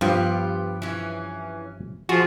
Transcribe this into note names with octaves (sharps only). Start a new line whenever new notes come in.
G2 F3 B3 F4 G4
E3 C#4
F3 F4 F#4 G#4